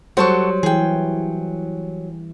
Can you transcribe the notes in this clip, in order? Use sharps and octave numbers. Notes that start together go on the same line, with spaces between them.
F#3 G3 F#4 A4 C5 C#6
E3 G#4 G5